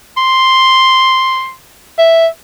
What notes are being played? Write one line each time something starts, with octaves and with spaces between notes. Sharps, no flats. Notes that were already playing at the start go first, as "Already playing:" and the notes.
C6
E5